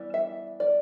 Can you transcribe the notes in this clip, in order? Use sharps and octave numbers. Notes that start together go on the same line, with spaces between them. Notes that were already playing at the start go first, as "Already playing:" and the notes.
Already playing: E3 G3 B3
E5
D5